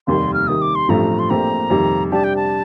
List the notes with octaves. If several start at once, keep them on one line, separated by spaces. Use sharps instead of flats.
F1 D#2 D#3 G3 C6
F6
C3 D#3 G3 D#6
D6
C6
A1 G2 F3 A3 C4 A#5
C6
A#1 A#2 A3 C4 G4 A#5
F2 C3 D#3 G3
C3 G3 D4 G4 A5
G5
A5